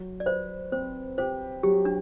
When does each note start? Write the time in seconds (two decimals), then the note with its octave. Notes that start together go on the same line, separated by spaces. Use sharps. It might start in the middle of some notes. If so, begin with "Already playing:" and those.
Already playing: F#3
0.20 D5
0.26 B4 C5
0.72 C4 C5
1.18 G4 C5
1.63 F#3 G4
1.85 D4